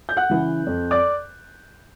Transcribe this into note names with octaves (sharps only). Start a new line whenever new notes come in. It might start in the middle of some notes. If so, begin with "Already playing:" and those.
G6
F#5 F#6
C#3 E3
F2
D5 D6